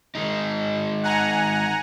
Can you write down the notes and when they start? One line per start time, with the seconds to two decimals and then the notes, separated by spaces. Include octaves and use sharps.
0.15 D#3 G#3 D#4
1.03 F#5 G#5 A#5